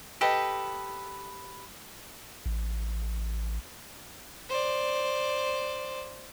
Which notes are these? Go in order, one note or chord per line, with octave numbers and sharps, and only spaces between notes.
G4 A4 B4 D#5
A1
C5 D5